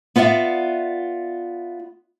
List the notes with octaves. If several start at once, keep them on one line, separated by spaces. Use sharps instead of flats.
B3 F4 D5 E5 F#5